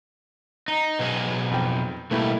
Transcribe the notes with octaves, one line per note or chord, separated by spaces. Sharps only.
D#4
B2 F#3 G#4
F2 G5
B2 G3 A3 A#3 E4